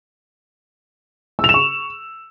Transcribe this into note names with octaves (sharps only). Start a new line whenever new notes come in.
E6
F7
E7
C#6